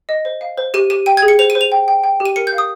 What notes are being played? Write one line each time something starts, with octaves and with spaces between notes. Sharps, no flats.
D#5
C5
F5
C5
G4 D#7
G4 D#7
G5 D#7
G#6
G#4
C#7
C5 F7
D#7
C5
F7
G5
G5
G5
G4
D#7
A#4 C#7
G6
F5
D#6